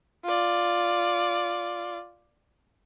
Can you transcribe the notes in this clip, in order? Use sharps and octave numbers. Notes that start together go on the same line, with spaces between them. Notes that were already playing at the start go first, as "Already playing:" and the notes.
F4 D5